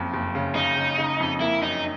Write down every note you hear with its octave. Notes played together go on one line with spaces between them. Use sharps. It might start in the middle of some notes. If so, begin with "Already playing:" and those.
Already playing: F#1 F2
F#1
C#3
C#3 D#4
C#3
C#3
F2
A#3 E4
F#2 D#4